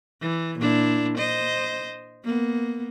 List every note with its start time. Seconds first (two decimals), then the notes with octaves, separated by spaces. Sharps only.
0.22 E3
0.59 A#2 D4 E4
1.17 C5 D#5
2.24 A#3 B3